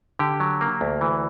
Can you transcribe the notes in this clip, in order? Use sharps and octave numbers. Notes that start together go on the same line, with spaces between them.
D3 G4
F#3
A#3
D2
E3